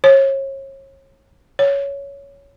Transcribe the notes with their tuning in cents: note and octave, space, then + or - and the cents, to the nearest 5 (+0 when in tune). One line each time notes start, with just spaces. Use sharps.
C#5 -35
C#5 +10